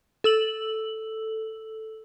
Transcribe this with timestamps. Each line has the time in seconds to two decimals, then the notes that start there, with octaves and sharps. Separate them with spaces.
0.24 A4 E6 F#7